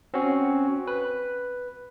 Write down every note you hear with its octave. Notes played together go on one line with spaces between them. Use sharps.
C4 C#4 F#4
B4